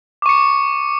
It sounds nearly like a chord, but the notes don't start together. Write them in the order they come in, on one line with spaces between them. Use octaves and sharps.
D6 C#6 C#7